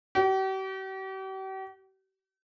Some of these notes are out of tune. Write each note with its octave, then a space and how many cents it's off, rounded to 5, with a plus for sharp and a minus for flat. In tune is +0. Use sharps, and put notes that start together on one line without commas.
G4 -45